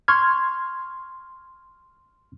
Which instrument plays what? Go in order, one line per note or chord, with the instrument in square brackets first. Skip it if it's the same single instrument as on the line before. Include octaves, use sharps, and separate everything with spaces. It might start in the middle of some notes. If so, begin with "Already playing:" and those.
[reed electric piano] C6 C#6 F6 G#6